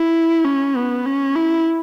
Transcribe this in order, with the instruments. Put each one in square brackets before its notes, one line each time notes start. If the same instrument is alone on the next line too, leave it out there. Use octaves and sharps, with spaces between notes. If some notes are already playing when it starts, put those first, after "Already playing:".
Already playing: [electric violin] E4
C#4
B3
C#4
E4